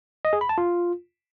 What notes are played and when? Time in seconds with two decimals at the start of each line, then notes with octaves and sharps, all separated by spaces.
0.25 D#5
0.33 G#4
0.41 B5
0.49 A5
0.58 F4